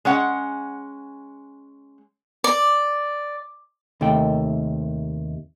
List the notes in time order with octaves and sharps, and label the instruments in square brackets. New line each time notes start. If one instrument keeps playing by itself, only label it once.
[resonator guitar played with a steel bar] G#3 C#4 F#5
[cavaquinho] D5
[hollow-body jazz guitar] D#2 C3 D#3 A3 G5